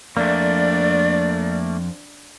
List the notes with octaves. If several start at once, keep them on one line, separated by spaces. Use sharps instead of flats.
F2 A3 A#3 D4 D5